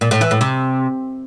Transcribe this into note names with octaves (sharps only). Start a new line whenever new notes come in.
A#2
A2
E3
A2
C3